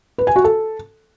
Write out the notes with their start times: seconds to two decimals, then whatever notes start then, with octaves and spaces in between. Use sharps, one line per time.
0.18 B4
0.27 G#5
0.36 F#4
0.44 A4